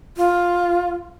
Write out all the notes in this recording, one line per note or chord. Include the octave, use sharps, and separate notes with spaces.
F4